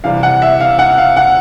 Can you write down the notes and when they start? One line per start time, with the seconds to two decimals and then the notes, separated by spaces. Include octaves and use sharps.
0.04 C3 E3 G3 F5
0.23 F#5
0.42 E5
0.60 F5
0.79 F#5
0.98 F5
1.17 F#5